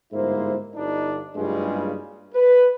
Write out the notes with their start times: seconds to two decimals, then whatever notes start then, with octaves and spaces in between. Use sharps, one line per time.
0.12 G1 G#2 A#3 E4 C5
0.75 G1 D4 D#4
1.35 F#1 G2 C#3 G3 G#3 F4
2.34 B4